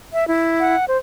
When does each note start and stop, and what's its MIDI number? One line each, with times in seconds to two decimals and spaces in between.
0.13 0.27 76
0.28 0.75 64
0.60 0.85 78
0.88 0.98 72